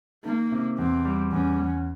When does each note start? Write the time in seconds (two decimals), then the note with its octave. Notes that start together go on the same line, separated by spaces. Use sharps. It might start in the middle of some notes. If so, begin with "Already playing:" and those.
0.24 D#3 A#3
0.51 C3
0.78 E2 C4
1.05 G3
1.32 E2 C#4
1.59 E2